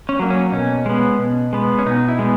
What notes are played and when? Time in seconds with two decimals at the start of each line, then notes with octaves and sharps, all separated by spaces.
0.09 C#4
0.19 F#3 A#3
0.30 C#4
0.52 B2 C#4
0.86 G#3 B3
1.19 B2
1.53 G#3 B3
1.79 C#4
1.86 B2 D#4
2.08 E4
2.19 G#3 B3